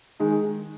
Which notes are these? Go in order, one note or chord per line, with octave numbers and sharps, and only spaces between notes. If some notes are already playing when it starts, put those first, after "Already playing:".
D#3 G#3 D#4 G#4